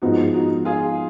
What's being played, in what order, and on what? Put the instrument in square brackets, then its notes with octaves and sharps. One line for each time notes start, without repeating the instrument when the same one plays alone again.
[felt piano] G#2 F3 B3 F4 [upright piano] D#4 F#4
[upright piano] D#4 F#4
F4 G#4